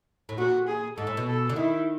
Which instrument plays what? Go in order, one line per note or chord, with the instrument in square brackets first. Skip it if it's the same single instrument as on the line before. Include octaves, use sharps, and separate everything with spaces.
[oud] A2
[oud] A#2 [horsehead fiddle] F#4
[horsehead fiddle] G#4
[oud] G#2 [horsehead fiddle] A4
[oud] A2
B2
[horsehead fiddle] A4
[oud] D3
[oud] D#3 [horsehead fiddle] E4